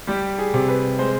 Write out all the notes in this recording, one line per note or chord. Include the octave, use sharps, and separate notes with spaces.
G3 G4
G#4
C3
B4
G#3 C5